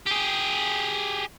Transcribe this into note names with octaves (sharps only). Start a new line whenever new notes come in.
G4 G#4